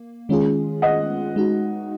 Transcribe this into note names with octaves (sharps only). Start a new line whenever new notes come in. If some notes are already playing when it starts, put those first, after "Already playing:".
Already playing: A#3
D#3 G#3 C#4 F4 G#4
D#5 F#5
G#3 D#4 F#4